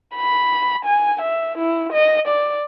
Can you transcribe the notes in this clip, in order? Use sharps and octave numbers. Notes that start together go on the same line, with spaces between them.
B5
G#5
E5
E4
D#5
D5